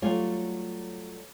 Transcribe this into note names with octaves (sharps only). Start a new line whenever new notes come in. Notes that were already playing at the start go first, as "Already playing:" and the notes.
F#3 G3 A3 F4 C#5